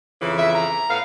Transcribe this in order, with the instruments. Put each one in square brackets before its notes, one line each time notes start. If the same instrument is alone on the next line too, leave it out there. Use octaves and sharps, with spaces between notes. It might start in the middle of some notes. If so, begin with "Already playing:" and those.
[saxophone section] F2 C#3 E3
[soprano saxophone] E5
A#5
[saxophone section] A2 B3 F5